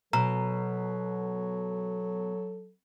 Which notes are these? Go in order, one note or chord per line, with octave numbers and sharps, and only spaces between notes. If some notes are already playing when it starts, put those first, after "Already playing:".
B2 F#3 A4 A#5